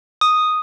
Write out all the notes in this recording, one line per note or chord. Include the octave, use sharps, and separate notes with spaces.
D#6